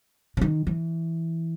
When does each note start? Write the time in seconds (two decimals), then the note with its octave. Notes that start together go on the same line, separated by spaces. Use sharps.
0.37 C#3
0.41 D#3
0.67 E3